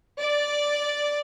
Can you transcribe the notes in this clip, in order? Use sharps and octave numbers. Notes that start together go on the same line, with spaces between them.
D5